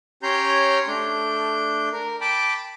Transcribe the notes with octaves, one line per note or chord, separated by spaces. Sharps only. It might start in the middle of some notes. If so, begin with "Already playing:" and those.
C#4 G4 C#5 A#5 C6 G6
A3 D4 G6
A#4
G5 A5 B5 D6